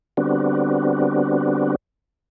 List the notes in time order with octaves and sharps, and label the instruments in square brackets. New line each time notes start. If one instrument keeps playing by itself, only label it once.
[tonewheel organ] D3 G3 B3 C4 D4 F#4